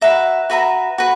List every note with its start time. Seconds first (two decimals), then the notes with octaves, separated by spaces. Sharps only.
0.01 F#4 B4 E5 A#5
0.50 F#4 B4 E5 A#5
0.98 F#4 B4